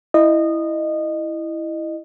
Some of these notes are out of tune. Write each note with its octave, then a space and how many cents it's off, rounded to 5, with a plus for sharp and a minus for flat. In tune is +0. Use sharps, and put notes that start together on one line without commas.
E4 +0 D#5 -20